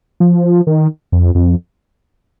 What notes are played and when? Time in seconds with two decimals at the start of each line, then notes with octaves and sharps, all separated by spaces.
0.20 F3
0.67 D#3
1.12 F2
1.35 F2